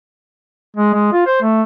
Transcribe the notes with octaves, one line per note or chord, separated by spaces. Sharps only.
G#3
G#3
F4
C5
A3